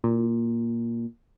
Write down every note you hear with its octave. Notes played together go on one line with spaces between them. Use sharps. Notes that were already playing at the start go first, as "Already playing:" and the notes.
A#2